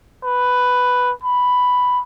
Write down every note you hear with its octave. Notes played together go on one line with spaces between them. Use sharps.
B4
B5